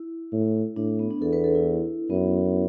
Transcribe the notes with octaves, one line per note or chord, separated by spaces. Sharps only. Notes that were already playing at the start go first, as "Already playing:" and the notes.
Already playing: E4
A2
A2 D4
D4
B3
D4
E2 A4
B4
A4
E4
F#2 B3